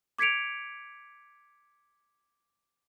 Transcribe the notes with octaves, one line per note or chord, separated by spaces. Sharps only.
D6 G#6 B6 C#7 D7 F7